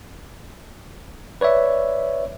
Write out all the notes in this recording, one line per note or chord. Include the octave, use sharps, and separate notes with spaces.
B4 C#5 D5 E5